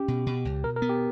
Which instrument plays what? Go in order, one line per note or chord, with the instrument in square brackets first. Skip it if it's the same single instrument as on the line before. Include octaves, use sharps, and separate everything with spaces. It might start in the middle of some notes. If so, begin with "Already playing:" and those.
Already playing: [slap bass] C#4 [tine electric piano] G4
[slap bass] B2
B2
C#2
[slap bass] B2 [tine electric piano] A#4
[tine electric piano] A#4
[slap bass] B3
[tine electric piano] G4